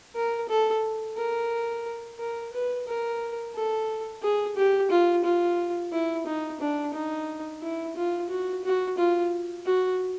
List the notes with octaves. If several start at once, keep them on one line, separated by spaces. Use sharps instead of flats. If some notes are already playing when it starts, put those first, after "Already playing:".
A#4
A4
A#4
A#4
B4
A#4
A4
G#4
G4
F4
F4
E4
D#4
D4
D#4
E4
F4
F#4
F#4
F4
F#4